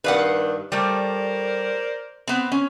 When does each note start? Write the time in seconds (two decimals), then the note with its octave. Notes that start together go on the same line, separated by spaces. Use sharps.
0.04 G2 D#3 D4 B4 F5 F#5
0.72 G3 A3 A#4 C5 D5
2.27 B3 C4
2.52 C#4